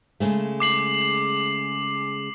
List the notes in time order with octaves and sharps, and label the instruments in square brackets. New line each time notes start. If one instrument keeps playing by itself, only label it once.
[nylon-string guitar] C#3 G#3 A3
[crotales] D6 C7 F#7